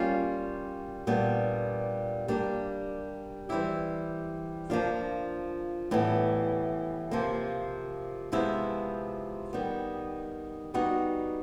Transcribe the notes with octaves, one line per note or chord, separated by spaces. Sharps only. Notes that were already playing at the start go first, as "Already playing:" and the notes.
Already playing: G3 A#3 C#4 F4
A#2 G3 B3 D4
G3 A#3 D4 G4
E3 G3 C4 E4 G4
F3 A#3 D4 F4
A2 E3 G3 B3
C3 F3 A#3
C3 F3 G#3 B3 E4
D#3 G3 B3
G3 B3 D#4 F#4